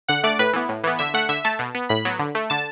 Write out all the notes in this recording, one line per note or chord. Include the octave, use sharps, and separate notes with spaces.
D3 F#5
A3 D5
A2 B4
E3 B3
A2
E3 B3
D3 E5
A3 F#5
D3 E5
A3 A5
B2
B3
A2 B5
F#3 B3
D3
A3
D3 A5